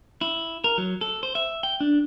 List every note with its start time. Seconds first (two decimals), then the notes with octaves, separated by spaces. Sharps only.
0.21 E4
0.64 A#4
0.78 F#3
1.01 A4
1.23 C5
1.35 E5
1.63 G5
1.80 D4